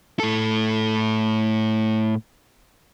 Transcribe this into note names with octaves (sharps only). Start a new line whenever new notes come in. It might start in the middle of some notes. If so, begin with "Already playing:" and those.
A2 A4